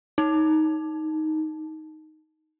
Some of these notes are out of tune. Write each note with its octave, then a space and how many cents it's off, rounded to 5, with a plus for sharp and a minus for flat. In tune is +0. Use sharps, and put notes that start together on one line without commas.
D#4 +10